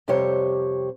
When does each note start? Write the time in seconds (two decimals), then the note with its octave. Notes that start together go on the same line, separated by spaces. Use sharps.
0.08 F2 C3 G3 G4 C5 C#5